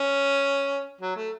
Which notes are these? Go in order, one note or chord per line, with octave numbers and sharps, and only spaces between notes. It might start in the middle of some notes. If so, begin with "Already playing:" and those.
Already playing: C#4
F#3
A3